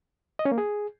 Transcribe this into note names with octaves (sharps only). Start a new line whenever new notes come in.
D#5
C#4
A#3
G#4